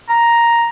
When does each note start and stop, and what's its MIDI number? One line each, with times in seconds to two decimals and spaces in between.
0.09 0.69 82